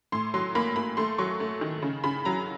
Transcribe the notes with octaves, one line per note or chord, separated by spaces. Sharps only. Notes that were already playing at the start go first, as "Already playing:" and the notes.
A2 C6
F#3 C6
A#3 B5
A#3 B5
A3 C6
F#3 C#6
A3
D#3
C#3
C#3 B5
F#3 A#5